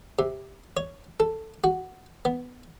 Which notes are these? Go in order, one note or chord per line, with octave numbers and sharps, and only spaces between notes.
C3
C#5
A4
F#4
B3